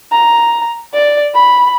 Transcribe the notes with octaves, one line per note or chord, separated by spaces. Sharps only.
A#5
D5
B5